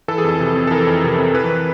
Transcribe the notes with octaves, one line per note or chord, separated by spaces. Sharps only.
E3 A4
G#4
F2 A4
C3
F2
A4
E3 A#4
F2
C3
F2
E3 B4